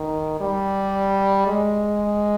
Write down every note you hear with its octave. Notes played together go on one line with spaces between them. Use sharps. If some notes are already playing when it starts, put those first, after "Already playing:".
Already playing: D#3
G3
G#3